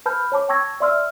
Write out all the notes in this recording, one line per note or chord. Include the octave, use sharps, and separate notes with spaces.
B4 A5 B5 F6 G6
C#5 A5 D6
G5 A5 C#6 E6 G#6 A#6
D5 E5 C6 E6 F6